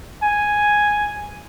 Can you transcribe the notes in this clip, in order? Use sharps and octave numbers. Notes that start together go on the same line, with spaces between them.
G#5